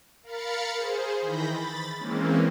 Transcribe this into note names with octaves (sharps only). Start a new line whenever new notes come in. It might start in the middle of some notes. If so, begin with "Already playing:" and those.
A#4 F5 B5 A6 C#7
G#4 C5
D#3 E3 B5 G6 A#6
B5 A6
E3 G#3 A#3 C4 C#4